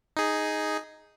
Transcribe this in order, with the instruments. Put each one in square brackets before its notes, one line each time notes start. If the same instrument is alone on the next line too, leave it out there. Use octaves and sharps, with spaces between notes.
[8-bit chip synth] D#4 G#4